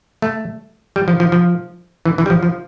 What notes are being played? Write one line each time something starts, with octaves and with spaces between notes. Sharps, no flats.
A3
G3
F3
F3
F3
E3
E3
G3
F3
F3